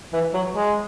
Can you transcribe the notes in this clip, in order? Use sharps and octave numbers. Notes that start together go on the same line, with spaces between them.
E3
F#3
G#3